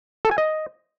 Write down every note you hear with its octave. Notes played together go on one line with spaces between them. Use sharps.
A4
G#5
D#5